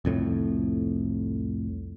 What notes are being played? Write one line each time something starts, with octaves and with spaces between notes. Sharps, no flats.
C2 F2 A2